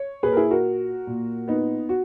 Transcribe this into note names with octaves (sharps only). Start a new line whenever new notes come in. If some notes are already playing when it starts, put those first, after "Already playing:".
Already playing: C#5
A#2 G#4 B4
A#4
E4 G#4
F#4 A#4
A#2
B3 D#4
F#4